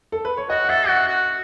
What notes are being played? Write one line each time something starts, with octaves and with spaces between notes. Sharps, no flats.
A4
B4
C#5
F#4 D#5
F#5
A4 E5
F#4 F#5
F#4